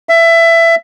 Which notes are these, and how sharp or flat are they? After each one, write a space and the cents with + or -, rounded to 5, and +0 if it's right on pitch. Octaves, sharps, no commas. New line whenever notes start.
E5 +20